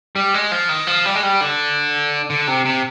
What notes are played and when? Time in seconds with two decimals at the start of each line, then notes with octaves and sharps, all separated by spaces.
0.16 G3
0.34 G#3
0.52 F3
0.69 D#3
0.87 F3
1.05 G3
1.15 G#3
1.23 G3
1.41 D3
2.30 D3
2.48 C3
2.65 C3